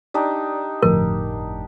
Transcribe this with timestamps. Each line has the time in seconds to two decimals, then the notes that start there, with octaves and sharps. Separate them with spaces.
0.14 D4 D#4 G4 D5
0.83 G1 F2 A2 A#4